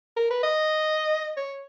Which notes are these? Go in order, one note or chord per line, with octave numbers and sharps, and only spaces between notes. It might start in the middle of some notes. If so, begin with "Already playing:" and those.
A#4
B4
D#5
C#5